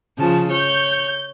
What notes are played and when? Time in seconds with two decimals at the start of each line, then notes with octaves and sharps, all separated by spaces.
0.18 C#3 F3 A5
0.51 C#5 G6